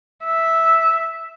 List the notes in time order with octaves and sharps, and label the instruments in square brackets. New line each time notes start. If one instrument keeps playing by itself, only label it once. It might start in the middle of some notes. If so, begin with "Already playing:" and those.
[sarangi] E5